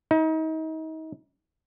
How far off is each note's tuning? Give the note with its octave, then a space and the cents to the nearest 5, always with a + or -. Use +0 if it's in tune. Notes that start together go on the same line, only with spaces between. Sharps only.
D#4 +35